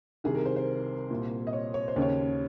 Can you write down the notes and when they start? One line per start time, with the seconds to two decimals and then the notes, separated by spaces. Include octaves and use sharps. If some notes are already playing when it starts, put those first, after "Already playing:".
0.24 C2 C3 D#3 G#4
0.35 A#4
0.46 C5
0.56 C5
1.10 C2 A#2
1.47 D#5
1.53 C#5
1.74 C#5
1.88 C5
1.96 D#2 C#3
2.02 C#5